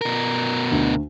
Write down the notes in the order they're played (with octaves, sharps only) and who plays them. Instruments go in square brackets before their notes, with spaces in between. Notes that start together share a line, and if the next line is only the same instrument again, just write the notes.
[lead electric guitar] B2 A#4
[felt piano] D2